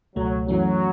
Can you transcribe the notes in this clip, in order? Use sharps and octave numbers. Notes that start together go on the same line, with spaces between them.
C#2 B2 F#3 A3
F#2 E3 F#3 A3 C#4